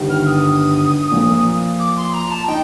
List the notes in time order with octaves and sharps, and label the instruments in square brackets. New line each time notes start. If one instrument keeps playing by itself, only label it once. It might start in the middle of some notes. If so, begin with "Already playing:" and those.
Already playing: [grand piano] G1 G2 D#3 G3
[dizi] F6
D#6
[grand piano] A#2 F3 A#3
[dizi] D6
C6
A#5
A5
[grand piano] D#4 [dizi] G5